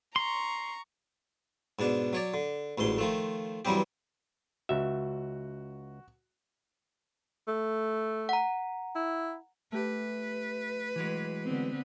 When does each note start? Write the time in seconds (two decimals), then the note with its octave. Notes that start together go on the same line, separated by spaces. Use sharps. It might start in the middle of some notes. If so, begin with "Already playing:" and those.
0.16 A#5 C6 C#6
1.79 G#2 B2 D4
2.13 F#3 C#5 D5
2.34 D3
2.78 A1 D2 G#2 C6
2.98 D#3 F3 A3
3.65 G2 E3 F#3 G3 C4 G4
4.69 C#2 F#4 E5
7.48 A3
8.29 F#5 A#5
8.95 E4
9.72 A3 G4 B4
10.96 E3 F#3 G#3
11.44 D3 B3 C4